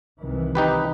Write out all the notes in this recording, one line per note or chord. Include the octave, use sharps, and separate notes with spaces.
C2 D#3 E3
D#4 G4 B4